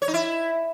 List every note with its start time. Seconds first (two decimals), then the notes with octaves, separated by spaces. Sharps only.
0.02 C#5
0.08 D#4
0.14 E4